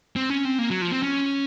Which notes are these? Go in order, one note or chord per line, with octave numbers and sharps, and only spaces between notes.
C4
C#4
C4
A#3
F#3
F3
C4
C#4